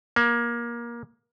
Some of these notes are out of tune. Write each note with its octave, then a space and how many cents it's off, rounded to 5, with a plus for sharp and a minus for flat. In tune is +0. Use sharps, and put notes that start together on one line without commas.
A#3 +20